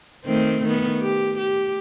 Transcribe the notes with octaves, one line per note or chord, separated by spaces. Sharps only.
D#3 A3 C4
D#3 B3
G4
G4